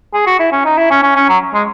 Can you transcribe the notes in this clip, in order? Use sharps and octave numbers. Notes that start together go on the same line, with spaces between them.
G#4
F#4
E4
C#4
D#4
E4
C#4
C#4
C#4
F#3
G#3